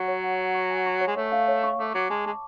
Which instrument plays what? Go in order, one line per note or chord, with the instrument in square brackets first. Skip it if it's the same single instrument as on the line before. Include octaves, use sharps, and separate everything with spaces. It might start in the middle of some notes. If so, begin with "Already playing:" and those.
Already playing: [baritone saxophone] F#3 [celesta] F#5 C#6
[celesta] C#5
F#5
F#5
C#6
G#5
C#6
C#5
[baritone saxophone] G#3
[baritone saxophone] A3 [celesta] C#5
[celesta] F5
C#5
C#6
[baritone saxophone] A3 [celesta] D6
[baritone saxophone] F#3 [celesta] D6
[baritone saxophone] G#3 [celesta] A5
[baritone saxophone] G#3 [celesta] A5